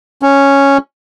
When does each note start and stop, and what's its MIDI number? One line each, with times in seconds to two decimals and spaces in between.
0.22 0.78 61